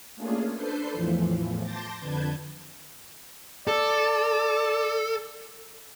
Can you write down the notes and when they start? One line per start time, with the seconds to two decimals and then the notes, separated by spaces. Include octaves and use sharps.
0.16 A3 A#3 C#4 D4 F4 G#4
0.53 D4 A4 B4 C5 G6 C7
0.93 E2 A2 E3 F3
1.61 A5 C6 D6 G6 A6 A#6
2.00 F2 D3 B4 A5 G6 G#6
3.68 A4 D5